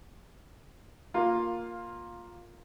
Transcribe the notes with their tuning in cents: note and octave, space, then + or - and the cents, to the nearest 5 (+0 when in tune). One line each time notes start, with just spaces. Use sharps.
A#3 +0 F4 +10